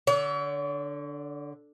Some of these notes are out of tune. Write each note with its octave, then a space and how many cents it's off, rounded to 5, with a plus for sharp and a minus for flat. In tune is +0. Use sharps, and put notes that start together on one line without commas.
D3 +0 C#5 +45